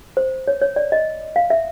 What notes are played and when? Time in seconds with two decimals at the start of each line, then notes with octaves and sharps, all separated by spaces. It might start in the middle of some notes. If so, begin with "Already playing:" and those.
0.17 C5
0.48 C#5
0.62 C#5
0.76 D5
0.92 D#5
1.36 F5
1.50 E5